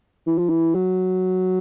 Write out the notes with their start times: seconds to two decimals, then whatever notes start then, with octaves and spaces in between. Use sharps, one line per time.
0.27 E3
0.38 F3
0.49 E3
0.75 F#3